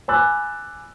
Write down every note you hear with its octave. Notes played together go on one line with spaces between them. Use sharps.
G#5 B5 D6 E6 F#6 A6